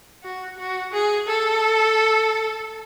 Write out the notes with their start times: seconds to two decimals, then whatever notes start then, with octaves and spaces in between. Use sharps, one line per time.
0.24 F#4
0.58 F#4
0.92 G#4
1.27 A4